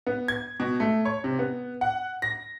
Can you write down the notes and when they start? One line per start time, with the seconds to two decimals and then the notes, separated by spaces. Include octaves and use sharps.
0.07 B3
0.28 G#6
0.60 B2
0.80 A3
1.05 C#5
1.24 C3
1.39 B3
1.81 F#5
2.22 A#6